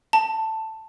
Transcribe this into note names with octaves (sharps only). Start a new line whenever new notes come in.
A5